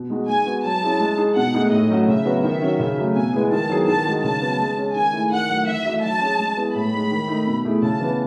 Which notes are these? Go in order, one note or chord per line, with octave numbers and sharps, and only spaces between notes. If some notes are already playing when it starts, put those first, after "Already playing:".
Already playing: B2
G#3 D#4 F#4
G#3 G#5
B3 F#4
F#3 A5
C#4 E4 G#4
G#3
D#4 G#4
B2 F#5
A3 D#4 G#4
A2 D#5
F#3 A3 C#4 F#4
C#3 E5
F#3 B3 F#4
D#3 E5
F#3 C#4 F#4
C#3
F#3 A3
B2 G#5
G#3 B3 E4 G#4
D#3 A5
F#3 B3 E4 G#4
D#3 A5
G#3 D#4 F#4
C#3 A5
F#3 B3
G#3
C#4 G#4
D#3 G#5
A3 E4 G#4
D#3 F#5
F#3 A3
E3 E5
A3 D#4 F#4
F#3 A5
C#4 G#4
G#3
B3 E4 G#4
A2 B5
G#3 D#4
D#3
A3 D#4
B2
A3 E4 G#4
C#3 A5
E3 B3